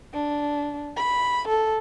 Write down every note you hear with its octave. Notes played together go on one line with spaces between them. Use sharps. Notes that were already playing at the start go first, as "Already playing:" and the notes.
D4
B5
A4